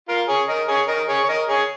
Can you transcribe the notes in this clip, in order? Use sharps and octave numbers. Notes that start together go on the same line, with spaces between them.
F4 A#4
G#4 C#5
A#4 D#5
G#4 C#5
A#4 D#5
G#4 C#5
C#5
A#4 D#5
G#4 C#5